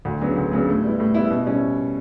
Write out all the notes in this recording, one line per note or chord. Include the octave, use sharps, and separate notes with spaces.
D2
C#3 F#3 B3 D4
D2
C#3 F#3 B3 D4
A2
G3 B3 E4
A2
G3 B3 E4
B2
G3 C#4 E4